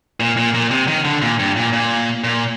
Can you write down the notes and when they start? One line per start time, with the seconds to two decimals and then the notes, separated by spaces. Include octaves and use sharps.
0.20 A#2
0.37 A#2
0.54 A#2
0.71 C3
0.88 D#3
1.05 D3
1.22 A#2
1.39 G2
1.56 A#2
1.73 A#2
2.24 A#2